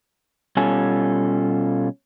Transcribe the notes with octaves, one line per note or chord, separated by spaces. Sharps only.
B2 G3 C#4 F4 A4 G#5